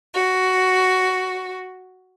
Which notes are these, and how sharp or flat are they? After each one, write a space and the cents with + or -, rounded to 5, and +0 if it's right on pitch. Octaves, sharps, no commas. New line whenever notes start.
F#4 +5